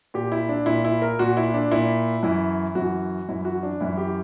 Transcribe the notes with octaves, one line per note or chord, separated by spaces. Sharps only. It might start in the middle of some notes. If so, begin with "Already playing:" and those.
A#2 G4
E4
D4
A#2 E4
E4
A#4
A#2 F#4
E4
D4
A#2 E4
F#2 E3 E4
F#2 E3 F#4
F#2 E3 E4
F#4
D4
F#2 E3 E4
G4